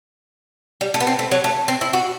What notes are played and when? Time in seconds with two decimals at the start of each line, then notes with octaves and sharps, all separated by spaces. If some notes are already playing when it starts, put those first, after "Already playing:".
0.81 G3
0.94 A3
1.00 B3
1.07 C4
1.19 A3
1.31 F#3
1.44 A3
1.68 C4
1.81 E4
1.93 F#4